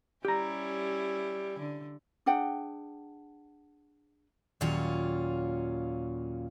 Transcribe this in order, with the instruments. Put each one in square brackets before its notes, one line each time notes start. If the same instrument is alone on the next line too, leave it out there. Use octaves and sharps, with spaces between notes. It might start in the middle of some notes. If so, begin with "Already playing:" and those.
[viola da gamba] G3 C#4 E4 [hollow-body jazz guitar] G4 A#5
[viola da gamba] D3
[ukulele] D4 G#4 F#5 G5
[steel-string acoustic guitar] D#2 A#2 F#3 C#4 F4